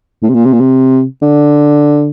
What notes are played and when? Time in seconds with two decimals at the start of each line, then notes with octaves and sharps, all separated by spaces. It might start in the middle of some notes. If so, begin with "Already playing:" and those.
0.22 A2
0.29 C3
0.34 A#2
0.45 C3
0.53 A#2
0.60 C3
1.22 D3